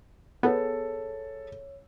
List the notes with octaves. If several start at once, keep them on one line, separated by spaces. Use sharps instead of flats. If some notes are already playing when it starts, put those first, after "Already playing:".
B3 G#4 A4 C#5